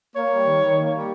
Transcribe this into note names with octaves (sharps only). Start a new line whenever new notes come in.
A#3 C#5
G3
D#3
D#3
A#3
G3